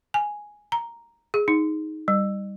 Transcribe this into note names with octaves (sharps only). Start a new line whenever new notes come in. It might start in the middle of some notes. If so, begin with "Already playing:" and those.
G#5
A#5
G#4
D#4
G3